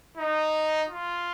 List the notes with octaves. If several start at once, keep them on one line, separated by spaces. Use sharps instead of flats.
D#4
F4